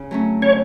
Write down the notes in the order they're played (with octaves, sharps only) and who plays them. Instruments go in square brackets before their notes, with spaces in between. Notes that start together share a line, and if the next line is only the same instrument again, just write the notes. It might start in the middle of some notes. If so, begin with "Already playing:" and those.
Already playing: [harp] C#3
F#3 A3 C#4
[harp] C#3 [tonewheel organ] C#5